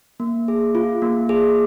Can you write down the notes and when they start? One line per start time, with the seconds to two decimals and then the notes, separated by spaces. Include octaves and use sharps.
0.20 A#3
0.48 G#4
0.75 F4
1.02 A#3
1.29 G#4